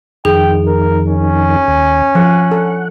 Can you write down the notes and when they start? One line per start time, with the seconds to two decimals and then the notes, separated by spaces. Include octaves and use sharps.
0.25 F2 D#3 G#4 G5
0.67 A#4
1.09 C#4
1.68 D#2
2.15 F3 F#5
2.52 A4